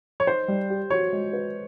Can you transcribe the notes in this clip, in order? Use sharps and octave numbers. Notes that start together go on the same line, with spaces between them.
C#5
D#4 C5
G3
G4
F#4 C#5
G#3
B4